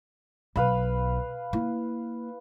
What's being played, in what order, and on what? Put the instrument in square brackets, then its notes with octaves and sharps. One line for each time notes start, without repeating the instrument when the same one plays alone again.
[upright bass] B1 [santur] B4 F5 B5
[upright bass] A#3 E4